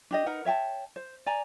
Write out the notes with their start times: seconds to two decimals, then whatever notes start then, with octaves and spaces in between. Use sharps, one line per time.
0.11 D4 G4 D#5
0.26 D#4 A#4 B4 F#5
0.45 C#5 E5 G5 A5
0.96 C5
1.26 D5 G#5 A#5